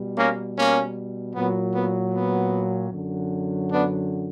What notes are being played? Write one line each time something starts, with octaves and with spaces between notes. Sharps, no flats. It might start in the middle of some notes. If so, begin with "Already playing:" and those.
Already playing: B2 G3
A#3 C#4
A#3 C#4
A#2 F#3 B3
B3
B3
F#2 D3 F#3
B3 D4